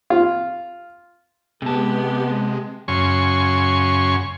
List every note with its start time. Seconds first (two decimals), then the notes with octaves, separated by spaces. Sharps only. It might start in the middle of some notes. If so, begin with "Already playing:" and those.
0.10 F4
1.62 C3 G#3 B3 G4 A5
2.88 F#2 C#3 G#5 C6 C#6